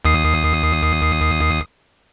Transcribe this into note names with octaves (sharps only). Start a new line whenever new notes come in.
D#2 D#6 C7